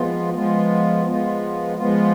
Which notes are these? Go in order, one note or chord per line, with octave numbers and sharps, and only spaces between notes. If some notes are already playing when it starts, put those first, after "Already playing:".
Already playing: F3 G#3 B3 F4
F3 G#3 B3 F4
F3 G#3 B3 F4
F3 G#3 B3 F4